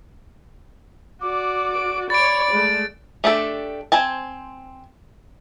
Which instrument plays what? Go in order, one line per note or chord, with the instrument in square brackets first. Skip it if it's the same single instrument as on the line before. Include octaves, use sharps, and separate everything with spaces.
[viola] F#4 D5 [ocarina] D6
[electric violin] D7
[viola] C#5 D6 [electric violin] D5 [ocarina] B5 [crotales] A6 D7
[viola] G#3 A3
[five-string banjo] A3 D4 G4 A4
C4 C5 G#5 A5